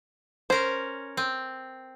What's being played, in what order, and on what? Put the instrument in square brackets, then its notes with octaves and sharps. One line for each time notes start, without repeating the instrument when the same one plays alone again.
[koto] C#4 A#4 [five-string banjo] C5
[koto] C4